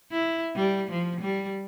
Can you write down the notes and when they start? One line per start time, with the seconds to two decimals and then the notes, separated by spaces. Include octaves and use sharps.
0.12 E4
0.56 G3
0.91 F3
1.21 G3